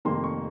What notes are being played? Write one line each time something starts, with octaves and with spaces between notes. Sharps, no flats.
F1 F2 D#3 A#3 C6
C#6